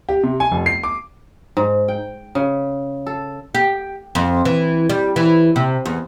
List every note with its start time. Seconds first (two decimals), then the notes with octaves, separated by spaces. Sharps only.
0.09 G4
0.23 C3
0.40 G#5
0.51 F1
0.66 C7
0.83 D6
1.57 G#2
1.88 G5
2.35 C#3
3.06 A4
3.55 G4
4.15 F2
4.45 E3
4.90 G3
5.16 E3
5.56 C3
5.85 E2